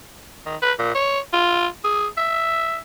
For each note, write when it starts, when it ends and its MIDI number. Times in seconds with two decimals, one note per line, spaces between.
0.46 0.56 51
0.62 0.72 71
0.79 0.92 46
0.95 1.20 73
1.33 1.67 65
1.84 2.07 68
2.17 2.78 76